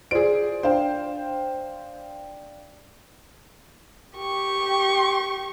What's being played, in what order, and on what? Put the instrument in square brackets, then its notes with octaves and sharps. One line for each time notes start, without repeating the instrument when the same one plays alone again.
[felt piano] F4 C5 D5 [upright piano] G#4 D7
[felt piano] D4 F5 G5 [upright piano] C5
[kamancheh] G4 C#6